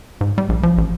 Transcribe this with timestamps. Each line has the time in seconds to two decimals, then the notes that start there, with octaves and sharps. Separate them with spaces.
0.21 G#2
0.38 G3
0.49 A#1
0.63 F3
0.78 A1